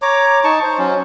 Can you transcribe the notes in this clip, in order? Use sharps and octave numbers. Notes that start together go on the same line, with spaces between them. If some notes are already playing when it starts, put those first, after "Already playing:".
C#5 A#5 D6
D#4 A5 C#6
C5
F#3 C#4